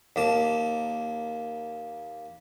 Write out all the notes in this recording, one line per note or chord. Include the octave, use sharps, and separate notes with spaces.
D#2 A#3 A5